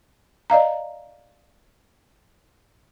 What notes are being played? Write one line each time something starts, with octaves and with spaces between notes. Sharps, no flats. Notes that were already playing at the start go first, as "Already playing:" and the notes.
D5 D#5 F5 A#5